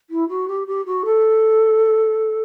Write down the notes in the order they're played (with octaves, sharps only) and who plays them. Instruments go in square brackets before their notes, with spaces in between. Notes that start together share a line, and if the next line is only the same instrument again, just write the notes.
[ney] E4
F#4
G4
G4
F#4
A4